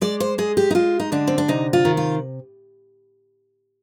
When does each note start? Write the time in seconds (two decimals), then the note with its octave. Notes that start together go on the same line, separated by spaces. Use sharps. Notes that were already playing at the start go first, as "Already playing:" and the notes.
0.02 G#3 D5
0.20 C5
0.38 G#3 G#4
0.57 G4
0.71 D#4
0.75 G#3 F4
1.00 D#4
1.12 D3 D4
1.27 C4
1.38 D4
1.48 C3 D#4
1.73 F4
1.85 D#3
1.97 F4